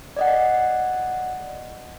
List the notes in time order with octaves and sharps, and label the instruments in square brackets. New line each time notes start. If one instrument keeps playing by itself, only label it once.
[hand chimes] D5 D#5 F#5